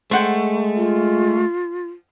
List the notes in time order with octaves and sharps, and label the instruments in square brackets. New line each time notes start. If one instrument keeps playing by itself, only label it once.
[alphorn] G#3 [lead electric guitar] A3 [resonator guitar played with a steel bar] C5 F#5 G5
[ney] F4